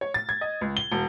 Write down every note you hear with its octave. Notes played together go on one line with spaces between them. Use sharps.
C#5
A6
G#6
D#5
C#2
G7
E1